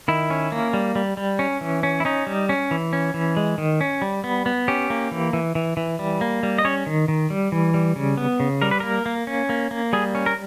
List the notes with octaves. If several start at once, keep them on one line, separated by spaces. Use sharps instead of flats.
D#3 E4
C#4
A#3
G3
G3
G3
C#4
E3
C#4
E4
C#4 D#4
G3
C#4
E3
C#4
E3
G#3
D#3
C#4
G3
B3
B3
C#4 G4
A#3
E3
E3
E3
E3
G3
A#3
G3
D#5
C#4 C#5
D#3
D#3
G3
E3
G3
C#3
B3
C#3
G3 A#4
B4
A#3 A#4
A#3
C#4
A#3
A#3
G3 G#4
C#4
A#4